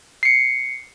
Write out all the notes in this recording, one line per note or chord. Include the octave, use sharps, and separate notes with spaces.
C7 C#7